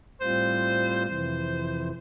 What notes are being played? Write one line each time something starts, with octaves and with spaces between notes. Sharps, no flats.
A2 G3 C4 F4 C5
F2 C3 E3 C5